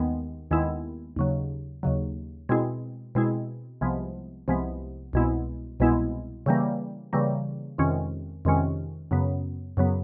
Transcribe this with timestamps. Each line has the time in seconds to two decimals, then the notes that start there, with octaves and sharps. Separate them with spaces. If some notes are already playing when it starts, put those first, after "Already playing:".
Already playing: D#2 D#3 G#3 B3
0.51 D#2 D#3 G#3 B3 E4
1.16 D#2 C#3 F#3
1.83 D#2 C#3 F#3
2.49 B2 G#3 C4 E4 G#4
3.15 B2 G#3 C4 E4 G#4
3.81 C2 C3 F3 G#3 B3
4.48 C2 C3 F3 G#3 B3
5.13 C2 B2 G#3 B3 E4
5.80 C2 B2 G#3 B3 E4
6.46 C#3 E3 G3 A#3
7.13 C#3 E3 G3 A#3
7.78 F2 C3 D#3 G#3 C#4
8.45 F2 C3 D#3 G#3 C#4
9.11 F#2 C#3 F#3 B3
9.77 F#2 C#3 F#3 B3